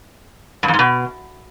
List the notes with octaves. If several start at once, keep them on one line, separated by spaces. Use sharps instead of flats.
G2
F2
G#2
B2